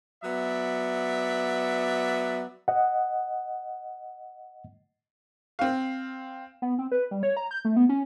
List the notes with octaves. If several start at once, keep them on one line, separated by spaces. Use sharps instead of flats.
F#3 B3 D5 E5
D#5 F#5
C4 F5
B3
C4
B4
G3
C#5
A#5
G6
A3
B3
C#4